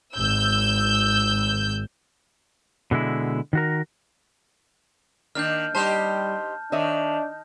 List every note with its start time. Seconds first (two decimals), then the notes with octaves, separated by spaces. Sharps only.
0.14 G#1 E6 G6
2.91 B2 D3 G#3 E4
3.53 D#3 F#4 A#4
5.35 D#3 A#3 D4 F6 G6
5.75 G3 D#4 G4 C5 A5 G6
6.72 D#3 D4 C#5 D#5 E5